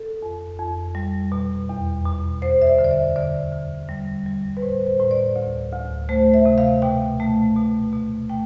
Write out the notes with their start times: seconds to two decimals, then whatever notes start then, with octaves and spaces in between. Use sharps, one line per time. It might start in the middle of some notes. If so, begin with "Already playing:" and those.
Already playing: A4
0.22 F2
0.59 F2
0.95 G3
1.32 B2
1.69 E2
2.05 B2
2.42 D2 C5
2.62 E5
2.67 D5
2.79 D3
2.85 D5
2.91 E5
3.16 D3 D5
3.52 D3
3.89 G3
4.26 G3
4.57 B4
4.62 A2 C5
4.87 C5
5.00 A2
5.11 D5
5.36 D2
5.72 D2
6.09 A3 C5
6.34 E5
6.45 C3
6.58 F5
6.82 B2 G5
7.20 A3
7.56 B2
7.93 B2
8.30 A3 G5